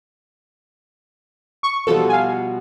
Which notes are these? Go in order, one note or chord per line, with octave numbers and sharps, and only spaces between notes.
C#6
B2 F3 G3 A4
F5 G#5